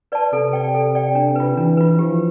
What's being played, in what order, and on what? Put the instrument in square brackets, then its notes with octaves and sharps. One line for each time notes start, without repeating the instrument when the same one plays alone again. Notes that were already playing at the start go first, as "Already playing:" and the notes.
[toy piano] B4 D5 A5
[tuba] C3 [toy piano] A4
[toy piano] D5 G5
A4
D5 G5
D4
F4 B4
[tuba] E3 [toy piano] D4
[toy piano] F4 B4
[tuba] F3 [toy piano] G4